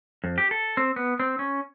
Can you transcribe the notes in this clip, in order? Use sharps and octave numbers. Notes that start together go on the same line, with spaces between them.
F2
G4
A4
C4
B3
C4
C#4